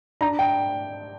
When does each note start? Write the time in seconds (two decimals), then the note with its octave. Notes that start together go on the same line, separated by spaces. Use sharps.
0.21 D4 A#5
0.39 G5